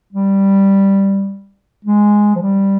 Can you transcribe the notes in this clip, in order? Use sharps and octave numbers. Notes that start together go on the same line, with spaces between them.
G3
G#3
F3
G3